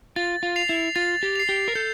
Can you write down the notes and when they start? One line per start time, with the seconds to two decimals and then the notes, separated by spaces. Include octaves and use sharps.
0.16 F4 A6
0.43 F4
0.56 C7 F7
0.69 E4
0.96 F4 A6
1.23 G4
1.36 C7 F7
1.49 G4
1.68 A#4
1.75 A4 G6